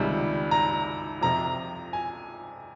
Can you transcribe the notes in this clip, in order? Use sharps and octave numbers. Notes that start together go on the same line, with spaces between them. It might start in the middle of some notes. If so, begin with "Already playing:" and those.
Already playing: C#2 C3 D#3 G3
A#5
F2 C3 F3 A#5
G#5